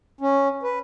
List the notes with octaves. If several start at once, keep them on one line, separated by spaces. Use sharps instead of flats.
C#4
B4